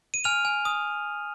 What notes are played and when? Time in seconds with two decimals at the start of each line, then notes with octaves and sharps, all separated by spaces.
0.14 D#7
0.24 G#5 F6 F7
0.45 G#5
0.65 D#6